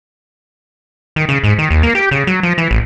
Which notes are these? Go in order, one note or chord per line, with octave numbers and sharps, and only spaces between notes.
D#3
C#3
G#2
D#3
D#2
A#3
G4
C#3
F#3
F3
E3
A1